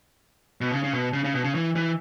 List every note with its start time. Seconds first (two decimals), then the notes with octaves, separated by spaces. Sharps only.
0.61 B2
0.72 C#3
0.84 C#3
0.93 B2
1.13 C#3
1.24 C#3
1.34 B2
1.44 C#3
1.55 E3
1.76 E3